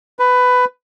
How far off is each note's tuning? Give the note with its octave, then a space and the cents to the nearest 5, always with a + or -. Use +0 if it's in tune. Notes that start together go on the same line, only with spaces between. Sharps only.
B4 +15